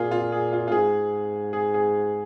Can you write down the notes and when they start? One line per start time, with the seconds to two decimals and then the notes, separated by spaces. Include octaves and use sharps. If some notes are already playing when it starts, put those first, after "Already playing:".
Already playing: A#2 F4 G#4
0.11 F4
0.32 G#4
0.53 F4
0.68 F4
0.72 G#2 G#4
1.53 G#4
1.74 G#4